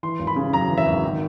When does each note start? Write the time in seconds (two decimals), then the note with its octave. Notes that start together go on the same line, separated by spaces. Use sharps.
0.03 E3 C6
0.19 G#1
0.27 B5
0.36 C#3
0.53 F#2 A#5
0.69 E3
0.78 E5
0.86 G#1
1.04 D#3